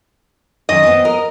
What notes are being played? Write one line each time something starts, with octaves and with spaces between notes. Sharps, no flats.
F#2 D#3 D#5
B3 C4
A#4